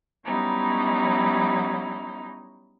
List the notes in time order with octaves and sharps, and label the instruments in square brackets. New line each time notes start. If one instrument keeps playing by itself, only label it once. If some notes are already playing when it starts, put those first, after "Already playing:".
[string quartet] F#3 G3 B3 C#4 D#4 E4